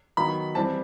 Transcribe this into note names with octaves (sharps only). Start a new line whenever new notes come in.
D#3 F#3 B3 B5
E3 G3 C4 A5